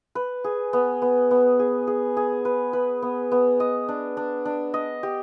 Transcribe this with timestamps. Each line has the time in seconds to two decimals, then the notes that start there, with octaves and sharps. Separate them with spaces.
0.15 B4
0.44 G#4
0.73 B3
1.02 B3
1.31 B3
1.59 G#4
1.87 G#4
2.17 G#4
2.45 B4
2.73 B4
3.02 B3
3.31 B3
3.60 D#5
3.88 D4
4.17 D4
4.45 D4
4.74 D#5
5.03 G4